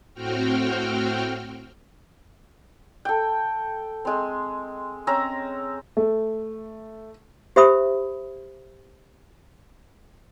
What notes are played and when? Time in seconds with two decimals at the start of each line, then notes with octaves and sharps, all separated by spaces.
0.14 A2 C4 F#4 G5 F6
3.05 A4 G5
4.05 G#3 C4
5.07 C4 C#4 A#5 E6
5.97 A3
7.56 G4 C5 E5 B5 D#6